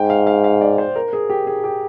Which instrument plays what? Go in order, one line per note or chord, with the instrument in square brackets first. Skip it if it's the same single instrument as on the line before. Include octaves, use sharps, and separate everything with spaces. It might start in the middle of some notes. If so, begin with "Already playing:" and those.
Already playing: [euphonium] G#2 [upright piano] G5
[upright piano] F5
F5
F5
D5
C5
A#4
G#4
G4
G#4
G4